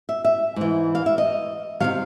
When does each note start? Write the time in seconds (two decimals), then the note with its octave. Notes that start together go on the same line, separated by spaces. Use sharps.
0.09 E5
0.25 E5
0.56 G#2 E3
0.95 F5
1.06 E5
1.18 D#5
1.80 C3 D#3 F#3 F5